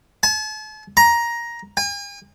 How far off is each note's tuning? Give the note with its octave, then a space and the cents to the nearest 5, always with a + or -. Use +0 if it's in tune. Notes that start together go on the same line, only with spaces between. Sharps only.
A5 -40
A#5 +15
G#5 -45